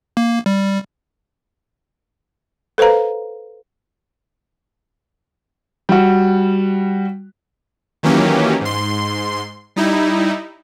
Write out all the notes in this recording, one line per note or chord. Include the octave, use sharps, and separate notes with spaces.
A#3
G3
A4 B4 C5 F5 A#5
G3 F#4
D#3 E3 F#3 A#3 C#4 G4
G#2 C6
G3 D#4 E4